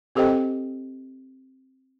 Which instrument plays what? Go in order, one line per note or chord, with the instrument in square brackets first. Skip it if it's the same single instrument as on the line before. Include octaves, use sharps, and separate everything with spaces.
[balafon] C4 G4 A4 C5 D#5 G5